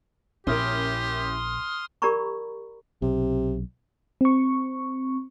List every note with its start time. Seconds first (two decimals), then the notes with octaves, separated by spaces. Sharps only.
0.47 A#1 C#4 E4 G4 A#4 C6 D#6 F6
2.02 G4 A#4 D5 A#5 B5 C#6
3.02 B1 C3
4.21 C4 C#6